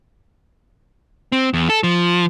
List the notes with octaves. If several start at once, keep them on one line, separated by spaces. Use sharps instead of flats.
C4
E2
A4
F3